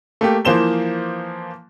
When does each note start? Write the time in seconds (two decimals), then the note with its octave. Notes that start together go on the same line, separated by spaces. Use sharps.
0.21 A3 A#3 G4
0.45 E3 F3 A#3 C5 E7 G7